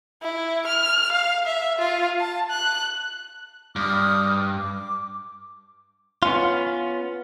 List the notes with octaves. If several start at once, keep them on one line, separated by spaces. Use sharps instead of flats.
E4
F6
F5
E5
F4
A5
F#6
G2 D6 D#6 F6
D6
B3 C#4 F4